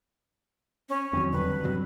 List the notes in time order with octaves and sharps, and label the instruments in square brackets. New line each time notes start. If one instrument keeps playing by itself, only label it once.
[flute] C#4
[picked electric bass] E2 D#3 F#3 [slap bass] C4
[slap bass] D3 G3 [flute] B4
[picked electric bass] G2 C3 F#3